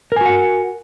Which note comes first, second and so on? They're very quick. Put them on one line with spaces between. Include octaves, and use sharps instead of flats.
A#4 G#5 F#4 F#5